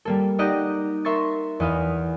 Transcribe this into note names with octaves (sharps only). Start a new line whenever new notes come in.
G3 A#3 A4
D#4 G4 D5 D#5 F#5 A#5
A#4 E5 C6 C#6 A6
E2 D#5 F5